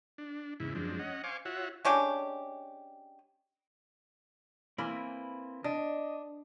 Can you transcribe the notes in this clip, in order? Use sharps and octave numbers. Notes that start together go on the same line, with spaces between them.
D4
E2 G#2 C#3 E4
F#2 F3 G#3 C4 D4
C#4 D#5 F#5
C5 F5 G#5 C#6 D6
F4 F#4 C#5 E5 F#5
G#3 C#4 D4 G4
E3 A#3 C4 B5
D4 D#5